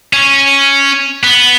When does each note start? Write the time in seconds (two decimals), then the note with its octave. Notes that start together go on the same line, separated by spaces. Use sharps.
0.13 C#4
1.23 B3